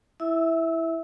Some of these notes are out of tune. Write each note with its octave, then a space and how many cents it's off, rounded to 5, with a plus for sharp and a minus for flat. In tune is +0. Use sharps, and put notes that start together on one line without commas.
E4 +0 E5 -10 E6 -25